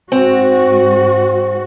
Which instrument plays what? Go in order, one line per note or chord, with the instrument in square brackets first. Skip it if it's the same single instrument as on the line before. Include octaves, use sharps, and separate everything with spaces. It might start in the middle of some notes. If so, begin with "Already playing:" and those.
[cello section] G#2 F#4 [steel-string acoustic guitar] C4